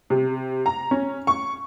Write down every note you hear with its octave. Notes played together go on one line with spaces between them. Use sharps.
C3
A#5
C#4
C#6